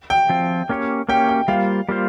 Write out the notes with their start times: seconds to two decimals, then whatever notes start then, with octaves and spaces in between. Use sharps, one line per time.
0.10 G5
0.29 F3 C4 F4
0.69 A#3 C#4 G4 C#5
1.09 A#3 C#4 G4 C#5 G5
1.28 G5
1.48 G3 A#3 F4 C5 F5
1.89 G3 A#3 F4 C5